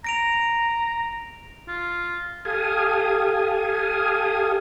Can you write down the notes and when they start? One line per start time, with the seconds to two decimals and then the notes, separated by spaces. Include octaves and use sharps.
0.04 A#5 A#6 D7 F7
1.68 F4
2.45 G4 A4 F5 G#5 D#6